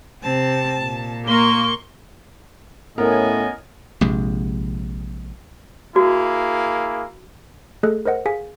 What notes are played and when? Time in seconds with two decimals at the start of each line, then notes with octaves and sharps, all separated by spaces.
0.23 C3 C4 A5
0.80 A#2
1.27 A#3 C6 C#6 G7
2.98 A2 B3 C#4 A#4 D#5 G#5
4.01 A#1 C3 G#3
5.96 A#3 E4 F#4 G#4
7.83 A3 G#4 A4 D#5 F#6
8.05 A#4 C5 D#5 F#5
8.26 G#4 F5 G#5 B6